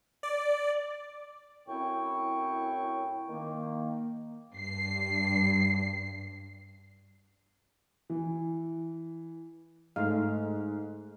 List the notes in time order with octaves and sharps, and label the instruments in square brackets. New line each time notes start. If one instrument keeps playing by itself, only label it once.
[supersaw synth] D5
[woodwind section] F#2 A2 C4 E4 G5 C#6
D#3 A#3
[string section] G2 C7
[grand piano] E3
[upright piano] G#2 [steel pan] A3 F5